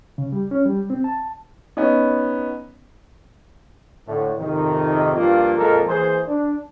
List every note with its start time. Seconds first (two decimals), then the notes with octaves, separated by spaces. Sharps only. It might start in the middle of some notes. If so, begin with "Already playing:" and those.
0.18 C#3
0.32 G3
0.51 C#4
0.66 G3
0.90 C4
1.04 A5
1.77 B3 C#4 D#4
4.07 A2 D3 A3
4.39 F2 G#2 C3 D#3
5.16 G2 F3 A#3 F4
5.57 F2 A#2 F3 G#3 A4 A#4
5.88 E3 A#3 G#4 C5
6.27 D4